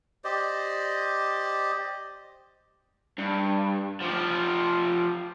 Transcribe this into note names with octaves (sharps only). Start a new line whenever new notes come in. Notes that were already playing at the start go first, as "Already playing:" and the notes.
G4 C5 D5 D#5
G2
F3 G4